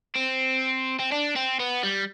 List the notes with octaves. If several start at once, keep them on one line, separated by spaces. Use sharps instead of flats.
C4
C4
D4
C4
B3
G3